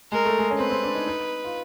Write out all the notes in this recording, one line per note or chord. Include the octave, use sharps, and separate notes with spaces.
G#3 A#4
A3
G#3
C#4
C4 B4
C4
D4
D#4
D#4
F4